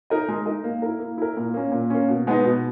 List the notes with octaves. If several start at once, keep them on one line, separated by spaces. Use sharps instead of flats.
D#4 A#4 D#5
G#3
D#4 A#4 D#5
A#3
E4 A#4
A#3
E4 A#4
A#2
A#3 C#4
A#2
A#3 C#4
B2
G#3 B3 D#4
B2